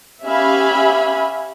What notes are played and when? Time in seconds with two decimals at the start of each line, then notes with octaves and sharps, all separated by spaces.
0.24 C#4 G4 E5 F5 G#5 B5